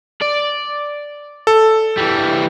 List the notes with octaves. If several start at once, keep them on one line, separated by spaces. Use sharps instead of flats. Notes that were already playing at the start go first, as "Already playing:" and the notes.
D5
A4
E3 G3